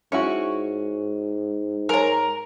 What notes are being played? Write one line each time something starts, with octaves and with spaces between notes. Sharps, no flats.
G#2 C#4 E4 F#4 C#6
G#3 A#4 C#5 A#5